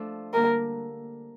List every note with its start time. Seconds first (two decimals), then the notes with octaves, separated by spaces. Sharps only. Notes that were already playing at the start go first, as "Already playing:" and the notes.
Already playing: F3 A3 D4 A4 D5
0.33 D3 G3 A#3 D4 A#4